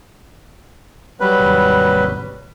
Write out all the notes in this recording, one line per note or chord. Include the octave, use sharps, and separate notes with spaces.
F#3 G3 B4
G#1 D#2